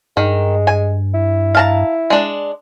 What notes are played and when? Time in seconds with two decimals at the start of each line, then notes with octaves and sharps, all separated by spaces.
0.17 G2 D#3 G#3
0.67 G#5
1.14 E4
1.55 F5 A5 A#5
2.10 G#3 D4